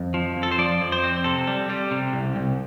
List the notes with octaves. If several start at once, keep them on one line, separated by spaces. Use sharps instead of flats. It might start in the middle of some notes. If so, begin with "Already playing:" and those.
Already playing: F2
F3
F2
A4
C5
F3 D5
F2
C5
C4
C3 A4
G3
G3
C3
C2
C2